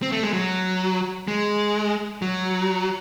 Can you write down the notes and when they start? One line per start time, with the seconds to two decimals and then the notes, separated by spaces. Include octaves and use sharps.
0.02 C4
0.12 A3
0.23 G#3
0.33 F#3
1.28 G#3
2.22 F#3